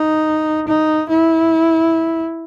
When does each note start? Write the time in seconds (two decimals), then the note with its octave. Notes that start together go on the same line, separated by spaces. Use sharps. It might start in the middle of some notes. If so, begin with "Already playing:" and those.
Already playing: D#4
0.67 D#4
1.09 E4